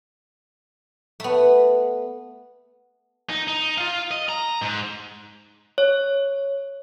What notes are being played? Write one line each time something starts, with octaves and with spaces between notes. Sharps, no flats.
A3 B3
D#4
D#4
F4 F5
D#5
A#5
G#2
C#5